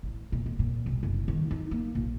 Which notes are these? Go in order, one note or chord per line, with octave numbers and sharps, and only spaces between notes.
A1
A#2
A#2
A#2
B1
F#1
D#3
D#4
A#3
A#1